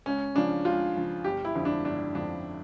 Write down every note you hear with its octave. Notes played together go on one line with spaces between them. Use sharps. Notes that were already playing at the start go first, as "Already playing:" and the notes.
C#2 C#4
C#3 F3 D4
C#2 F4
C#3 F3
G1 G4
E4
F2 D3 F3
D4
G1 D4
F2 D3 F3 D4